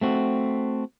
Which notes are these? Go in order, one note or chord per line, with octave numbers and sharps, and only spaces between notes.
A3 C4 F#4